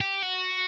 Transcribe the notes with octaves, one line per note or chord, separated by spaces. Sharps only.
G4
F#4